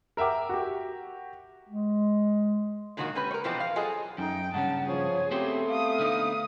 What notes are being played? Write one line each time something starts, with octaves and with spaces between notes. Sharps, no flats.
A#4 E5 F#5 G5 D6
F#4 G4
G#3
A#2 D#3 F#3 A#3 D4 F#4
C#4 G4 B4
A#4 C#5
B2 E3 F3 G#3 B3 C4
F5
F#3 F4 G#4 A4 D#5
F#2 D#4 G5
G2 C#3 C#4 F#5 A5
F3 G#4 C#5
A3 B3 C4 G4 C5
F5 D#6
D3 B3 D#4